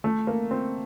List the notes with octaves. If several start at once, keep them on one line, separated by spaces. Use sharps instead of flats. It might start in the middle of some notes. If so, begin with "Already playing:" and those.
A3
A#3
C4